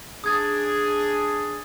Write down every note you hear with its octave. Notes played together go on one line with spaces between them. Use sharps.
D4 G#4 D#6 G#6 A6